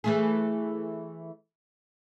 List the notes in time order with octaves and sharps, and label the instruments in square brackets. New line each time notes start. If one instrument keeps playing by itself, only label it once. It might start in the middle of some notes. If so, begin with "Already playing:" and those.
[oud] E3 A3 G#4